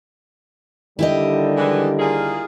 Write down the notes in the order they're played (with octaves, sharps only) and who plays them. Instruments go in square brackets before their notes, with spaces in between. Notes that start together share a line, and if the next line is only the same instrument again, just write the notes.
[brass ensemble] D3 D#3 G3 [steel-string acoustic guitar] E4 G4 D#5
[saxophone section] E3 G#3
A#3 F4 G#4